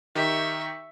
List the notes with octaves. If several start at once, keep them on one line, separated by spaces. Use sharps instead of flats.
D#3 D#4 G4 E5 C#6